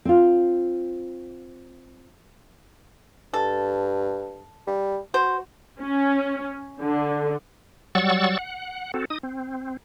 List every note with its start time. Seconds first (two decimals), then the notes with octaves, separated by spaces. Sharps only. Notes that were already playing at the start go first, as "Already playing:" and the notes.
0.05 C4 F4
3.34 G2 A4
4.67 G3
5.14 F#4 C5
5.80 C#4
6.81 D3
7.95 F#3 G3 F#5 C#6 E6 A6
8.39 F#5
8.94 C4 F#4 A4
9.10 D#4 D#6
9.23 C4